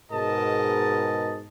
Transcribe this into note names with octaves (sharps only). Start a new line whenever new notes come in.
G#2 B2 G#4 A#4 D#5 A5